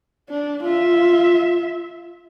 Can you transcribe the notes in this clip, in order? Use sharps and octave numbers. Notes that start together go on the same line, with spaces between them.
D4
F4 E5